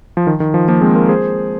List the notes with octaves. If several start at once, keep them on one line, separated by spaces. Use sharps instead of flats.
F3
D#3
D#3
F3
F3 A#3
G#3 C4
F4 A#4
G#4 C5